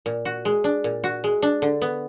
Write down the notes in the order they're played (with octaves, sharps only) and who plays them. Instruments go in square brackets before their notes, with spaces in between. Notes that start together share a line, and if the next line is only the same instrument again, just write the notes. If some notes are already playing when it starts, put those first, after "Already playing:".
[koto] A#2
F#4
G#3
D4
A#2
F#4
G#3
D4
D3
B3